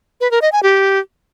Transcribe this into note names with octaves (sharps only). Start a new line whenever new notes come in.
B4
A#4
D#5
G#5
G4